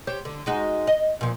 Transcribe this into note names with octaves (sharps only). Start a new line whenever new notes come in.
G4 C5 C#5
D3
G#3 D#4 F#4
D#5
A#2 F3